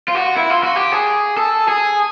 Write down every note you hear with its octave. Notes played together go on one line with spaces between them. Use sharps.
F4
F#4
E4
F4
F#4
G4
G#4
A4
G#4